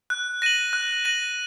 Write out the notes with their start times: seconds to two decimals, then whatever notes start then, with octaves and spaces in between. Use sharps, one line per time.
0.10 F#6
0.42 A#6 D#7 F#7
0.73 F#6
1.05 A#6 D#7 F#7